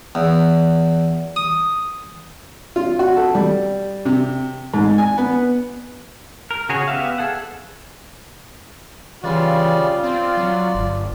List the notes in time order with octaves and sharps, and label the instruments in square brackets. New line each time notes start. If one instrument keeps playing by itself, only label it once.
[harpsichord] E2
D#6
[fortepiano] F4
F#4
A4
G3
C3
G#2
G#5
B3
[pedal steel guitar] A#4
C#3 F#4 G#4 C#5
B3 G4 E5 F5
G#4 A4 F#5
[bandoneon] C#3 G3 D5 [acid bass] E3 [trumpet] F4
[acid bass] C4 [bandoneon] D5
[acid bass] F#3
G1